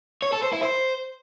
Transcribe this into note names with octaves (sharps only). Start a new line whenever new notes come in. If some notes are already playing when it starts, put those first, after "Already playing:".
C#5
A4
C5
E4
C5